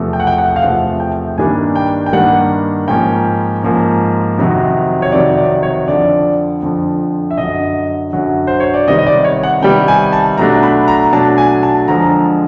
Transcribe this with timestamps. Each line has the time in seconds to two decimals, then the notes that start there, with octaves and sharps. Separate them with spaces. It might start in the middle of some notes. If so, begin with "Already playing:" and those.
Already playing: E2 C3 F3 A3
0.13 G5
0.20 F#5
0.27 G5
0.38 F#5
0.56 F5
0.63 E2 C3 F3 A3 F#5
1.00 G5
1.38 G2 D#3 G3 A#3 D4 G#5
1.76 G5
2.06 G5
2.13 G2 D#3 G3 A#3 D4 F#5
2.88 G#2 F3 A#3 C#4 G5
3.63 G#2 F3 A#3 C#4
4.38 F2 C3 D#3 F#3
5.02 C#5
5.12 F2 C3 D#3 F#3 D5
5.37 D5
5.63 C#5
5.87 F2 D3 F3 D5
6.63 F2 D3 F3
7.31 E5
7.38 F#2 D3 F#3 D#5
8.13 F#2 D3 F#3
8.47 C5
8.60 C#5
8.74 D5
8.88 C3 D#3 G3 B3 D#5
8.99 D#5
9.07 D5
9.25 C#5
9.43 F#5
9.62 C3 D#3 G3 B3 G5
9.88 G#5
10.13 A5
10.38 B2 F#3 A3 D4 A#5
10.63 B5
10.88 A#5
11.12 B2 F#3 A3 D4 A5
11.38 G#5
11.63 A5
11.88 F2 D3 F3 G#3 A#5